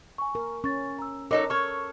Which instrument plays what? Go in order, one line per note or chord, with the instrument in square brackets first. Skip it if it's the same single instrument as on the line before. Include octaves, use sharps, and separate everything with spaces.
[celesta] G#5 C#6
[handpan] A#4
[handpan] C#4 [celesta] C#6 A6
[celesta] A#5 E6
[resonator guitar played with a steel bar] F#3 D#4 A4 [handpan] A#4 [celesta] C#5 D#5 D6
[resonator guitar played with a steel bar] A4 C#5 [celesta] C#6 F6 G#6